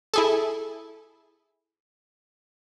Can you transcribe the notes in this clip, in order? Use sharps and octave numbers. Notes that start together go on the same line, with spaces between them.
E4 G#4 A4